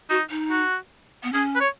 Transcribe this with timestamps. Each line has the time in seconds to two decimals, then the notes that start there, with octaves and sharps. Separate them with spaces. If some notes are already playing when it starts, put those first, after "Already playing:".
0.10 D#4 F#4
0.30 D#4
0.51 F#4
1.23 B3
1.33 C#4 G#4
1.56 B4
1.60 C#5